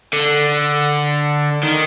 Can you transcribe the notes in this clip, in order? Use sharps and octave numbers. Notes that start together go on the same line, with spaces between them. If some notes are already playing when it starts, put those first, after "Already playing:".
D3
D#3